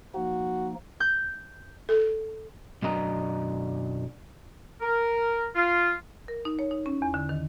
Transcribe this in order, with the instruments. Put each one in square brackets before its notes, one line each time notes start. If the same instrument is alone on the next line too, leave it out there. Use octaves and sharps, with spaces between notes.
[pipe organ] F3 A#3 D#4 [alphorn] F#4
[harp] G6
[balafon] A4
[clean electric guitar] B1 F#2 F#3 D4 D#5 A#5
[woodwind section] A#4
F4
[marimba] A#4
D#4
C#5
D#4
C#4
E2
D3
D#3